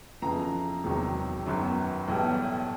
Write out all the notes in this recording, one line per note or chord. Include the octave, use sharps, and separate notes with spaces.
F2 C#3 E3 A#5
E1 E2 C3 D#3 F#3
G1 F#2 D#3 F#3
B1 A2 E3 G3